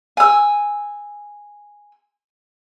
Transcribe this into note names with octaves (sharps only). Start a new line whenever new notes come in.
G#5 E6